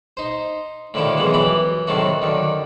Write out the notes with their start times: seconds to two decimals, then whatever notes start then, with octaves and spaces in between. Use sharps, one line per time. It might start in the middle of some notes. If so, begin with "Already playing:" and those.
0.17 D#4 C5
0.94 A2 D3 D#3 F3 E4 G4
1.17 B1 E3 F3 G#3 B3
1.34 F#2 E3 G4 B5
1.87 A2 C3 D#3 F#3 A3 F#4
2.22 F#2 D3 D#3